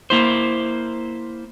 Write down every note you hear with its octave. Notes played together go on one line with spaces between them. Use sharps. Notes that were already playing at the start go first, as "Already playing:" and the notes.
A#3 E4 C5